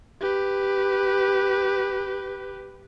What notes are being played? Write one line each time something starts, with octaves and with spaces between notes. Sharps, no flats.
G4 B4